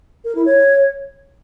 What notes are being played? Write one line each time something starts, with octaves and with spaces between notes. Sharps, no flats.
A#4
E4
C#5